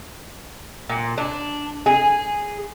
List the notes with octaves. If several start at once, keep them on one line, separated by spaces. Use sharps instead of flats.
A#2
D4
G#4